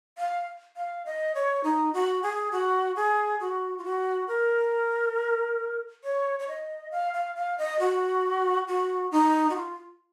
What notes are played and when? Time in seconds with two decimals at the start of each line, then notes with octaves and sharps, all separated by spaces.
0.18 F5
0.76 F5
1.05 D#5
1.35 C#5
1.64 D#4
1.93 F#4
2.23 G#4
2.52 F#4
2.96 G#4
3.40 F#4
3.78 F4
3.84 F#4
4.28 A#4
6.04 C#5
6.39 C#5
6.48 D#5
6.91 F5
7.14 F5
7.36 F5
7.58 D#5
7.79 F#4
8.67 F#4
9.11 D#4
9.50 F#4
9.56 F4